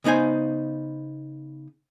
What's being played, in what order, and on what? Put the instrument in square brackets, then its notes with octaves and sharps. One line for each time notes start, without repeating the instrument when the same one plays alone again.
[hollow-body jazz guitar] C#3 B3 D#4 C5 G#5